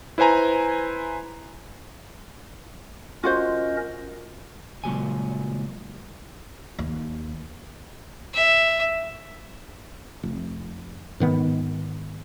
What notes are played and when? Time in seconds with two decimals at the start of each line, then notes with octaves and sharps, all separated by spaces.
0.18 E4 B4 C5 G#5 A#5
3.24 C#4 F4 F#4 A#4 C5 D#5
4.84 C#2 A#2 F#3 G3 G#5
6.79 D#2
8.34 E5
10.23 F1
11.20 G#2 D#3 B3